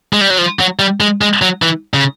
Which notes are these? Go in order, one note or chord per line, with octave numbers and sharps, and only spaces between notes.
G#3
G3
F#3
F3
F#3
G3
G#3
G#3
F#3
E3
C#3